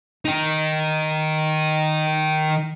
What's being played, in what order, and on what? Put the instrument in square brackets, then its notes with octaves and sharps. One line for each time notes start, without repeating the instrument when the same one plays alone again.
[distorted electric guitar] D#3 D#4